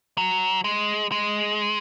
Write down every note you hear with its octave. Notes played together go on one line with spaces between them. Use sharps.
F#3
G#3
G#3